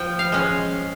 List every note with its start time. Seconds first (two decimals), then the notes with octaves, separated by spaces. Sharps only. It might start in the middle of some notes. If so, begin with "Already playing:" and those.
Already playing: F3 G5
0.19 F5
0.32 G#3 C#4